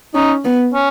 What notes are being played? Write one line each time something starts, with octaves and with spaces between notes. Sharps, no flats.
C#4 D#4
B3
C#4